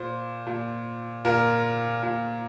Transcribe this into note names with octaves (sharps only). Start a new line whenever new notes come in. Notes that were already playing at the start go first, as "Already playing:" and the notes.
Already playing: A#2 C5
A#2
A#2 A#4
A#2